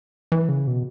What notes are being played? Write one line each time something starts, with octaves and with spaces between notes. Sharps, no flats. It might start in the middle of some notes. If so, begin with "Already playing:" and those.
E3
C#3
B2